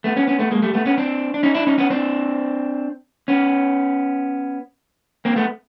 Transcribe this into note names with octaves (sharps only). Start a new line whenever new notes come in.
A3 B3
B3 C#4
B3 C#4
A3 B3
G#3 A#3
G3 A3
A3 B3
B3 C#4
C4 D4
D4
C#4 D#4
D4 E4
C#4 D#4
B3 C#4
C4 D4
B3 C#4
A#3 C4
A3 B3